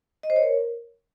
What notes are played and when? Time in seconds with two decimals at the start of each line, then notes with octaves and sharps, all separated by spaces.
0.23 D#5
0.30 C5
0.36 C#5
0.43 A#4